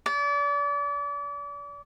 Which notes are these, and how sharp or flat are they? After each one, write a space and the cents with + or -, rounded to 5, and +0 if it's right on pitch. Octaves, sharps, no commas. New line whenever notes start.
D5 -35